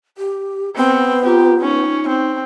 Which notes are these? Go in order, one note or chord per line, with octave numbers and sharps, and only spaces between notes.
G4
B3 C4
F4 G4 A#5
C#4 D#4
C4